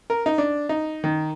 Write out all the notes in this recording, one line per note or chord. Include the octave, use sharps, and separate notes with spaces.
A#4
D#4
D4
D#4
D#3